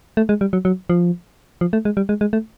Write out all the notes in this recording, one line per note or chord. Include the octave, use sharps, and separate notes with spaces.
A3
G#3
G3
F#3
F#3
F3
F3
A3
G#3
G3
G#3
G#3
A3